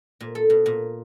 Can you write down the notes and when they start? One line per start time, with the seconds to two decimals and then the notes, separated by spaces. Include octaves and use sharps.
0.20 A#2
0.35 A4
0.50 B2
0.66 A#2